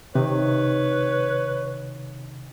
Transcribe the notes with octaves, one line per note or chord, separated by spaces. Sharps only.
C3 D#3 B4 C#5